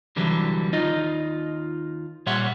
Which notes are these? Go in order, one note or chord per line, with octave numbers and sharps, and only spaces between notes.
C2 D3 E3 F#3 G3 B4
D#2 D#4 F4 D#5
A#2 G3 C#5 E5 F#5 C6